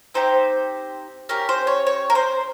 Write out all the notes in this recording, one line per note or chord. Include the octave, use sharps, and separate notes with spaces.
C4 D#4 G4 C5
C#4 G4 A#4
C5
C#5
C#5
A#4
C5